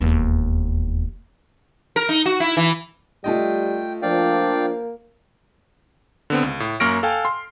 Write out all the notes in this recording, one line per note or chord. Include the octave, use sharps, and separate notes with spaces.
E1 D#2
A#4
D#4
F#4
E4
E3
G3 A3 F4 D#5 G5
F3 A#3 D4 D5 F5 G5
D3 B3 C4
C#2
A2
F#2 A#3 C#6 F6 A#6 D7
A4 F5 G5 G#5
C6